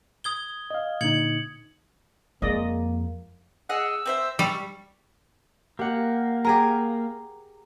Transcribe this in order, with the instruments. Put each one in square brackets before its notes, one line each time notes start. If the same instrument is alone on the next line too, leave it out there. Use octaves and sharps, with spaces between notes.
[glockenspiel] D#6 G#6 G7
[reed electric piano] D#5 F5
[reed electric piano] A#2 D3 D#4 [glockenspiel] G#6 C#7 F#7
[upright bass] F2 [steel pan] G#3 D5 D#5 [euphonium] A#3
[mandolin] G#4 D#5 F#5 [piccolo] E6
[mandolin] C4 C5 E5
[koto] G3 [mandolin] C#6
[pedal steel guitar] A#3 [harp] G4 F#5
[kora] G4 G#4 A#4 [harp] A#5